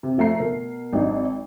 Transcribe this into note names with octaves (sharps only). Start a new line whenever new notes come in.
C3
F3 A3 A#5 C7
B2 A#4
G#1 F#3 D4 D#4